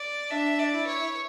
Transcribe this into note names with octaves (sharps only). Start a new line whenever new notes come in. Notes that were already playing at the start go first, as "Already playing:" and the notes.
Already playing: D5
D4 E5
D5
E4
C#5